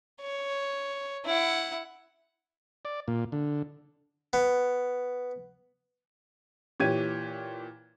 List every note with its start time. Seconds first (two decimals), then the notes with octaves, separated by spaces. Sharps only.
0.21 C#5
1.25 E4 F#5
2.85 D5
3.08 A#2
3.32 D3
4.33 B3
6.80 A#2 E3 G4 C#5 G#6 D#7